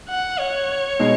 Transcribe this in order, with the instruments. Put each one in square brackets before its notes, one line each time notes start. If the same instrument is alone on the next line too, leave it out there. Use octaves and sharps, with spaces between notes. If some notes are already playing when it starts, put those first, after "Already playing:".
[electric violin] F#5
C#5
[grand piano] B2 G#3 D#4